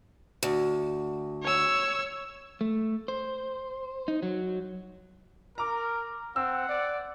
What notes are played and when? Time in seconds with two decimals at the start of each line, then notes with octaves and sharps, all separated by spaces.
0.43 D2
1.42 C#5 E6
2.61 A3
3.08 C5
4.08 D#4
4.23 F#3
5.58 A#4 A#5 D6
6.36 C4 F#5 E6
6.69 D5